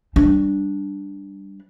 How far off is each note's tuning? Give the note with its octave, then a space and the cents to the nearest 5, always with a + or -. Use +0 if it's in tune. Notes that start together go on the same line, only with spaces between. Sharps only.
G3 +0 D4 +0